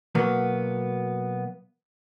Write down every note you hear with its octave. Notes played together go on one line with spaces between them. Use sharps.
B2 F#3 A#3 B3